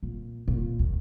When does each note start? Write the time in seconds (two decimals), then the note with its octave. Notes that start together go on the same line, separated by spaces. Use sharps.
0.03 A#2
0.48 A#2
0.79 D#2